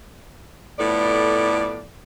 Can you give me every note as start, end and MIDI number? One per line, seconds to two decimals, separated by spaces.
0.78 1.86 41
0.78 1.86 45
0.78 1.86 59
0.78 1.86 74